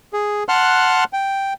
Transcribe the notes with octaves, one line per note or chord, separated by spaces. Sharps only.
G#4
F#5 A5 C6 F6 F#6
G5